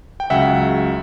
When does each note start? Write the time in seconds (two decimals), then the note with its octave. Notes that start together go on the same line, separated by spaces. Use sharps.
0.20 G5
0.30 C#2 C#3 F#3 E5 F#5